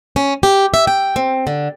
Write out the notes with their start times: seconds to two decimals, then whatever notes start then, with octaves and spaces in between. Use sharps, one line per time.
0.16 C#4
0.43 G4
0.74 E5
0.87 G5
1.16 C4
1.47 D3